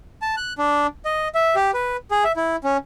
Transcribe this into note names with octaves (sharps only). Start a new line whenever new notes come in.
A5
F#6
D4
D#5
E5
G4
B4
G#4
E5
E4
C#4